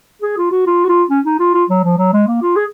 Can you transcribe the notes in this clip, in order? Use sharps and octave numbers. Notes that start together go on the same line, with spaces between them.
G#4
F4
F#4
F4
F#4
F4
C#4
D#4
F4
F4
F#3
F3
F#3
G#3
A#3
F4
G#4